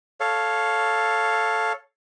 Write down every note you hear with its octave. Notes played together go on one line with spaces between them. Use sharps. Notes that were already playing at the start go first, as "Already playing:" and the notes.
A4 C#5 F5